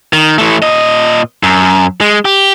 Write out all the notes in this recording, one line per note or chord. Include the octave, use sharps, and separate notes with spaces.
D#3
E3 A3
A#2 D#5
F#2
G#3
G4